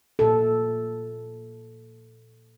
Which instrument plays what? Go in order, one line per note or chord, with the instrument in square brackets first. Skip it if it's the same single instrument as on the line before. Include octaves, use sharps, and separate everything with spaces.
[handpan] A#2 A4